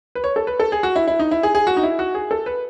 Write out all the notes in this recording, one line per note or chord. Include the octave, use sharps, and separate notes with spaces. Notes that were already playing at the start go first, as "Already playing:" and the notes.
B4
C#5
A4
B4
A4
G#4
F#4
E4
E4
D#4
E4
G#4
G#4
F#4
D#4
E4
F#4
G#4
A4
B4